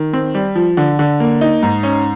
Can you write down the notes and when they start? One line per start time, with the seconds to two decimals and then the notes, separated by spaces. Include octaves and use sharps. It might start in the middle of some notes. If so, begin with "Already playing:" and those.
Already playing: D#3
0.13 C4
0.34 G3
0.55 F3
0.77 D3
0.99 D3
1.20 A#3
1.41 D#4
1.62 G#2
1.83 C#4